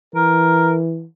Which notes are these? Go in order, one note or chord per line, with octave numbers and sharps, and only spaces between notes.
E3 A#4